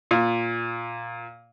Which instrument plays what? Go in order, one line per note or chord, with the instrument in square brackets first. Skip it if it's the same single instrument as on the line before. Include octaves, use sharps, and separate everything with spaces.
[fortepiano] A#2